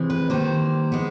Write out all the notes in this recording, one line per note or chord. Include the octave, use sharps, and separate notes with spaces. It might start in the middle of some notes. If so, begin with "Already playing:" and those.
Already playing: C3 E3 G#3 C4
B4
D#3 G3 A#3 C5
G#3 B3